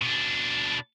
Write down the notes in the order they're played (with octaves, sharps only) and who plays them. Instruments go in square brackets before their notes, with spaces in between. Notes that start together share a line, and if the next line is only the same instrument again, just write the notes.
[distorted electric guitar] B2 D4